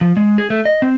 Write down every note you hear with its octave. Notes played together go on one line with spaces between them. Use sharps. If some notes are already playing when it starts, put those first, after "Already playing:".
F3
G#3
G#4
A3
D#5
C4